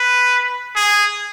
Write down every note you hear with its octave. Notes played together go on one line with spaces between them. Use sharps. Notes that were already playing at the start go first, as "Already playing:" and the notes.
Already playing: B4
G#4